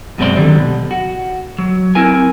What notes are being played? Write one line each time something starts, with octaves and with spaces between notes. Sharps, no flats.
F#2 B2 G#3 C4 D5 C6
D3 D#3 F#3 G3
B2
F#4
F#3
C4 E4 A#4 G#5